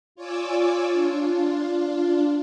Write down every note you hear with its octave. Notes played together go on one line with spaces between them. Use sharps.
F4 C#5 D5 G#5 D6 E6
D4 F4